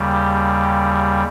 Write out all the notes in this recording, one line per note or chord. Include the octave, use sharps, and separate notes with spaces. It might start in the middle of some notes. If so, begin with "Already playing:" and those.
Already playing: D#2 C#3 G3
G4
G4